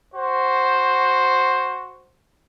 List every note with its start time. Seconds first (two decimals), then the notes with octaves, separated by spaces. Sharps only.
0.14 F#4 C5